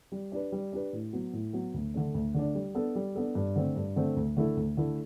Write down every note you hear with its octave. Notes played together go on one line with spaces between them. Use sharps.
G3
D4 G4 B4
G3
D4 G4 B4
A2
F#3 B3
A2
F#3 B3
D2
D3 A3 D4
D2
D3 A3 D4
G3
B3 D4 A4
G3
B3 D4 A4
G2
D3 A3 C4
G2
D3 A3 C4
D2
D3 A3 E4 A4
D2
D3 A3 E4 A4